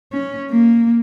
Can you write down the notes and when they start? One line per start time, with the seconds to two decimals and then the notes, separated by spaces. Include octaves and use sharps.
0.13 C#4
0.51 A#3